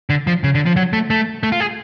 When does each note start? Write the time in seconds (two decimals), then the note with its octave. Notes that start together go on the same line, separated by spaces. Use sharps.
0.10 D3
0.27 F3
0.44 C#3
0.55 D3
0.66 F3
0.76 F#3
0.93 A3
1.10 A3
1.43 A3
1.52 F4
1.60 G#4